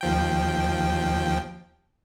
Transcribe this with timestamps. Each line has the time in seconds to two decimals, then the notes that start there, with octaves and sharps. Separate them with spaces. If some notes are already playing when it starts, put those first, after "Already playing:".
0.01 D#2 F3 G5